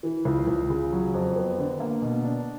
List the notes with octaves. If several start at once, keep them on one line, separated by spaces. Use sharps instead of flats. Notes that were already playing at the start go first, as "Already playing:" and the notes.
E3
C#2
C#2
C#3
F#3
F2
B3
D3
A#3
B2
D4